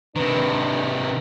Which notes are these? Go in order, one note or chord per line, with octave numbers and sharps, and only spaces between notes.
C3 D#3 D4 B4